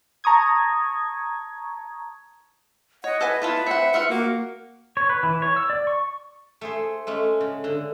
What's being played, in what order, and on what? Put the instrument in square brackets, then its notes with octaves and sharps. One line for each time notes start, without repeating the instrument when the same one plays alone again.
[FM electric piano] A5 A#5 C#6 D#6 G#6
[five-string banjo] C#5 [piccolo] D#5 [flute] F#5
[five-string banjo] A4 F#5 G#5 [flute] B4
[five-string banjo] B3 E4 F4 [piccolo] A5
[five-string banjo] C4 F#5 [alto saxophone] E5 [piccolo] C#7
[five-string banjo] F4 E5 F#5 [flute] F6
[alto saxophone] A#3 [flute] F#4
[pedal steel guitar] C#5
B4
E3
C#5
E6
D5
C#6
[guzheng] A3 G#4 C5
G#3 A3 C#4
C#3
D3